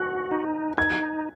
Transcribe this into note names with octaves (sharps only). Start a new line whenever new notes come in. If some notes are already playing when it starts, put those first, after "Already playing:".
Already playing: F#4 F#6
D#4
D#4 G#6